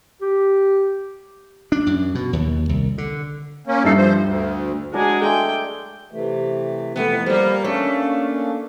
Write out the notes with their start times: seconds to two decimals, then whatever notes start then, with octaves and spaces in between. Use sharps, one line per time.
0.22 G4
1.72 D4
1.87 F#2
2.15 B2
2.33 D#2
2.69 C2
2.98 D3
3.67 A#3 C#4
3.84 G2 D#4 A4 E5 C7
3.97 F3 C5
4.23 D2
4.94 F#3 G#3 D4 G#4 A#5
5.23 G#3 A3 G#4 G5
6.12 C3 E3 A3
6.96 F2 C3 E3 A3 B3
7.26 G3 A#3 C5
7.64 A3 A#3 C#4 D4 C#5